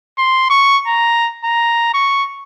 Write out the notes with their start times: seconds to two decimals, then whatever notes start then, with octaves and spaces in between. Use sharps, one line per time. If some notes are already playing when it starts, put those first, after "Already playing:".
0.18 C6
0.50 C#6
0.87 A#5
1.44 A#5
1.94 C#6